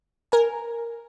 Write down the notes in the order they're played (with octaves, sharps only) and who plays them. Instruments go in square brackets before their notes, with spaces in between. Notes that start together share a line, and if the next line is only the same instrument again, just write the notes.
[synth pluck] A#4 G#5